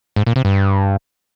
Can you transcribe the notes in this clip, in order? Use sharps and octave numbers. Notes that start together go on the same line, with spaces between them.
G#2
A#2
C3
G2